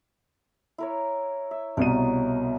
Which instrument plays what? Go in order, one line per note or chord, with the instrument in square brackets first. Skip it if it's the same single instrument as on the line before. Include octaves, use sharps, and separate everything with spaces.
[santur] E4 A#4 C#5
E5
[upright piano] C2 B2 D#7 [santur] A#4 C#5